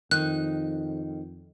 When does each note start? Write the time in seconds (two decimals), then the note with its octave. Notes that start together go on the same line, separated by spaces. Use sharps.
0.11 F2 D#3 D#4 F#6